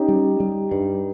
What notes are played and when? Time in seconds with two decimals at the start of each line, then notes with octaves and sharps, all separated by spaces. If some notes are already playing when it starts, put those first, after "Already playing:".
Already playing: C#4 D#4 G4
0.08 G3
0.40 G3
0.71 G2